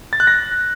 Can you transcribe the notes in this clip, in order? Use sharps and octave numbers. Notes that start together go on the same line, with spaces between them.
A6
F#6
A#6